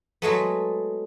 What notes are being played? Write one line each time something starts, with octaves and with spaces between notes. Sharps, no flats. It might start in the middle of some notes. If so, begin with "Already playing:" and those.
F#3 G#3 A3 B3